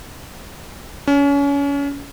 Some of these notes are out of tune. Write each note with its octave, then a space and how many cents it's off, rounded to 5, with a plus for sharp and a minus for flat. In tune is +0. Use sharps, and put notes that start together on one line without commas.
C#4 +30